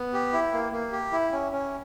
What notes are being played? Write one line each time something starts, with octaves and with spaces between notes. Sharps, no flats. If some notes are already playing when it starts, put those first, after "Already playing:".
Already playing: B3
G4
E4
A#3
A#3
G4
E4
C#4
C#4